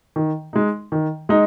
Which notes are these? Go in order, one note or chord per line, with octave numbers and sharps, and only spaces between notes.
D#3
G#3 D#4
D#3
G#3 D#4